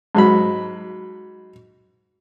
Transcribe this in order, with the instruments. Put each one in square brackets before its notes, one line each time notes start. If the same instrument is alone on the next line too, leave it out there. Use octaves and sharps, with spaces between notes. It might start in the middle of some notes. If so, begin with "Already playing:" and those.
[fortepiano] G#2 F#3 B5